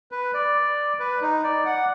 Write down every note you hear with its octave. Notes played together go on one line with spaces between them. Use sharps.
B4
D5
B4
D#4
D5
F#5